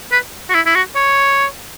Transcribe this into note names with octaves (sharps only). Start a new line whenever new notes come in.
B4
F#4
E4
E4
F#4
C#5